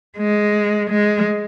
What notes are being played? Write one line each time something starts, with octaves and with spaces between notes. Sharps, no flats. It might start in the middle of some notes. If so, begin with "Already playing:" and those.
G#3
G#3